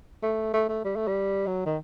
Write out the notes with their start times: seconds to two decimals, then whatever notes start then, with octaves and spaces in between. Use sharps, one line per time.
0.22 A3
0.53 A3
0.69 A3
0.84 G3
0.96 A3
1.07 G3
1.46 F#3
1.66 D#3